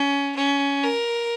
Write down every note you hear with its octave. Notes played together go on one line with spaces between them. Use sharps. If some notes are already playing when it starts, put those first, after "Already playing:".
Already playing: C#4
C#4
A#4